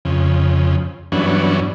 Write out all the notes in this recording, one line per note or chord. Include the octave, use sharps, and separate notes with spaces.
F2 C#3
G2 E3 F#3 B3 C#4 D4